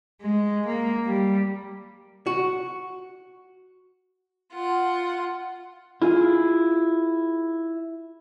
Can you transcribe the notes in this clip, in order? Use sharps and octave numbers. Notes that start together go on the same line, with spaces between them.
G#3
A#3
G3
F#4
F4 F#5
E4 F4 G#4